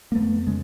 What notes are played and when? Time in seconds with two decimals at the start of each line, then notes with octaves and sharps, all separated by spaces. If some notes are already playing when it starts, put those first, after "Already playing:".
0.12 A#3
0.15 F2 A3 B3
0.47 C#3 G#3